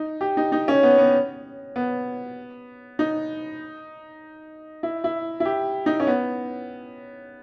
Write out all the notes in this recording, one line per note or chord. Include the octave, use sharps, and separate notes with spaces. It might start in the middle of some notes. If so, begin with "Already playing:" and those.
Already playing: D#4
G4
D#4
D#4
C#4
B3
B3
B3
D#4
E4
E4
E4
G4
D#4
C#4
B3